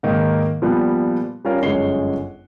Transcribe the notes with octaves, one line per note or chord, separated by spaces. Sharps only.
G#2 D#3 A#3
A#2 F3 G3 B3
G3 C#4 F4 A#4
G1 F#2 G#3 C#5 C7 G7